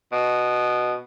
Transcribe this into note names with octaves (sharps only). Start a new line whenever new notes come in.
B2